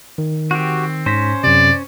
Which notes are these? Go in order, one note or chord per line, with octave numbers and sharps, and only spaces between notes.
D#3
C4 F#4 G4
G#2 C#4 C5 A#6 B6
F#2 C3 D5